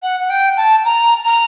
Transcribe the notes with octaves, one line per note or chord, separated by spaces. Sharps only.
F#5
F#5
G5
A5
A#5
A#5